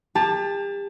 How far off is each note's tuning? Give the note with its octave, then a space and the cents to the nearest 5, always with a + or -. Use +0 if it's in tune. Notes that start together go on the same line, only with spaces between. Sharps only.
G4 +40 A5 +0